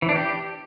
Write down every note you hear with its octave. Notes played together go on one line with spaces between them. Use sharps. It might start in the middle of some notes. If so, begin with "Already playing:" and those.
E3
D4
G4